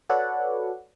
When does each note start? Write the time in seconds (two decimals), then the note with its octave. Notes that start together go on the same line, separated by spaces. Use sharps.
0.09 F#4 A4 B4 C#5 D5 F#5